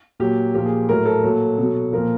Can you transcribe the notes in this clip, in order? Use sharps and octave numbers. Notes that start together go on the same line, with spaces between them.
A#2 F#3 G4
A#2 F3 G4
G#4
A2 F#3 A#4
A4
A#2 F#3
B2 F#3
A#2 F3 A#4